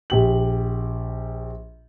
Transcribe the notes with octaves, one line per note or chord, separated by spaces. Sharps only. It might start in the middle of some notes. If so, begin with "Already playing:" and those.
A#1 G4 F#7